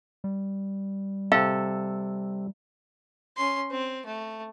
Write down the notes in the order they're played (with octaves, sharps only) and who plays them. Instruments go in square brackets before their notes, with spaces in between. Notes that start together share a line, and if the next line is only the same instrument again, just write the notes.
[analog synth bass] G3
[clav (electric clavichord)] C3 A4 [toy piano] F5
[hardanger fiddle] C#4 C6
C4
A3